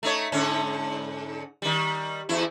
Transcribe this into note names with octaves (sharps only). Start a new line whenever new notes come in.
A3 D#4 C#5
G#2 D3 C#4
D#3 G3
E2 E4